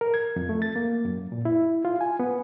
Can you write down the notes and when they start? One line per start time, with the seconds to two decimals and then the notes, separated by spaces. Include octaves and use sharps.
0.01 A#4
0.14 G#6
0.36 F2
0.49 A3
0.62 A6
0.76 A#3
1.05 F#2
1.32 A#2
1.45 E4
1.85 F4
2.01 G#5
2.20 B3